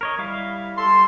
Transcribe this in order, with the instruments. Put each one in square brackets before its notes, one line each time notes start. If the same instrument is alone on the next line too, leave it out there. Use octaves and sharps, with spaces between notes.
[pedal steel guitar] A#4 C#5 D#5
G3 E4 F5
[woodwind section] A4 A5 C6